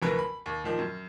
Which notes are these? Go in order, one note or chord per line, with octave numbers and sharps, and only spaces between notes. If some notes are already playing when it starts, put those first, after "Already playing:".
F#1 D2 E3 A#4 B4
B5
D#2
A#2 D#3 F3
F#2